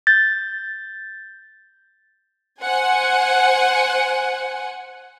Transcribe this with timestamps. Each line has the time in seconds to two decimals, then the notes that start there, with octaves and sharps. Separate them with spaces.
0.07 G6 A6
2.62 C5 F#5 G#5